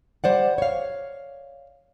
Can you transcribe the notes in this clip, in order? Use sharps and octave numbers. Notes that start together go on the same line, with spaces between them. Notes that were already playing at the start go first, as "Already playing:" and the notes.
G3 C5 D5 F#5
C#5 F5